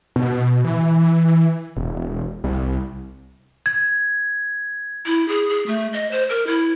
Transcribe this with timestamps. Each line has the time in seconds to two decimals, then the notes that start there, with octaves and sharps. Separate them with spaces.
0.16 B2
0.64 E3
1.77 E1
2.44 C2
3.66 G#6
5.06 E4
5.29 G#4
5.49 G#4
5.67 A3
5.93 D#5
6.11 C5
6.30 A#4
6.47 E4